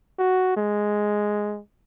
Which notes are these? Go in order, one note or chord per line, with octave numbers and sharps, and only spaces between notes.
F#4
G#3